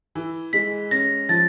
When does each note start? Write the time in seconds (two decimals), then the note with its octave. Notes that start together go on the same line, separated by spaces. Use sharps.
0.15 E3
0.53 G#3 B6
0.91 C#4 A#6
1.29 F3 A6